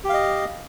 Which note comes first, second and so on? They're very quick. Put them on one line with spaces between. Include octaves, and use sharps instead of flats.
G4 F5 D#5